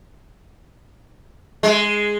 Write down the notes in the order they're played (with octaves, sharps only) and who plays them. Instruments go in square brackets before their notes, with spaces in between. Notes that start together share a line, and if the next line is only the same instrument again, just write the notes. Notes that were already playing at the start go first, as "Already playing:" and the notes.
[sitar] G#3